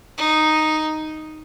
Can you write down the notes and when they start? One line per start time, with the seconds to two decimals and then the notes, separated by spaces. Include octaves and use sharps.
0.18 D#4